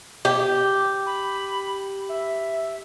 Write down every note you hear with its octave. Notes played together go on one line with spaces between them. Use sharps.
G4
B5
E5